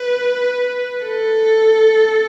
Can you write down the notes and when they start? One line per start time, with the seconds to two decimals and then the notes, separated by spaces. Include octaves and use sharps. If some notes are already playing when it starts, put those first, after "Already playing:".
Already playing: B4
1.06 A4